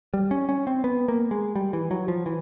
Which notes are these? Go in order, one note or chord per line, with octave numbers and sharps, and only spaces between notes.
G3
C#4
C#4
C4
B3
A#3
G#3
G3
E3
F#3
F3
E3